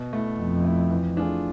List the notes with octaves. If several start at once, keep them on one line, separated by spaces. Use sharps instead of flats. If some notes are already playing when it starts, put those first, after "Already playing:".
Already playing: B2
A3 E4
F2 B2
A3 E4
E3
A3 D4 F4 G#4